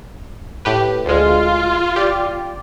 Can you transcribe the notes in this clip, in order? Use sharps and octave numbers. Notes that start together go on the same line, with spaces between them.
A2 G4 B4
D2 G#3 F4
G4 D5